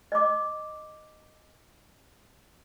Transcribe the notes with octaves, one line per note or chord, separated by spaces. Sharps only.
D#5 D6